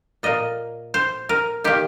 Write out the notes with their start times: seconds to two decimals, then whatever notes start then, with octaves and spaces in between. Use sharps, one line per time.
0.23 A#2 A#3 D#5
0.94 C5
1.29 A#4
1.64 D#3 A#3 G4